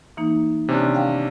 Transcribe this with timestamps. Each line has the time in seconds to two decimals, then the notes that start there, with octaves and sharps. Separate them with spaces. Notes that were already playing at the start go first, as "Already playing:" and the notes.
0.17 E3 A#3 D#4
0.68 C3 D#3 C#4 D4
0.95 F5 G5